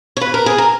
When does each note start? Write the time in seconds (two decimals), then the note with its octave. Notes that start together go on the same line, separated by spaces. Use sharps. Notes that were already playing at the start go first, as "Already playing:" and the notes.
0.17 C#5
0.21 B4
0.34 A#4
0.46 G#4
0.58 A#4